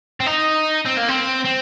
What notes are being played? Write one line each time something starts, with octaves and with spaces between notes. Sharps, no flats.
C4
D#4
C4
A#3
C4
C4